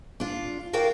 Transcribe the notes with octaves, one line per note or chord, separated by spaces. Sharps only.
D4 F4
F#4 A#4 D5 F5 G5